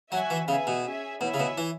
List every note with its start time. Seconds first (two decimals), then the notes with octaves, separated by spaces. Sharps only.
0.12 F#3 F#4 E5 G#5
0.30 E3
0.48 C#3 B3 G#4 E5 G#5
0.67 B2
0.85 C#4 G#4 E5 G#5
1.21 B2 E4 C#5 E5 G#5
1.34 C#3
1.39 B2
1.58 E3